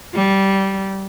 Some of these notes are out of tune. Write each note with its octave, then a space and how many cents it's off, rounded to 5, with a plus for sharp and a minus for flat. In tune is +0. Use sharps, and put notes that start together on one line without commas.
G3 -15